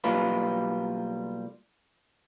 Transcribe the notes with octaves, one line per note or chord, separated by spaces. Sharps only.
B1 G3 A#3 F4 B4